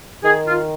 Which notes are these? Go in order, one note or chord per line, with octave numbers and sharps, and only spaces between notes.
D#3 G#4
F4